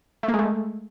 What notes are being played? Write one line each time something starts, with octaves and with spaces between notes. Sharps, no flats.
A3
A#3
G#3
A3